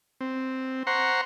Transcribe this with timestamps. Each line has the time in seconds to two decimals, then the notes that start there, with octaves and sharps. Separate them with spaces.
0.21 C4
0.87 C5 F#5 A#5 C6 C#6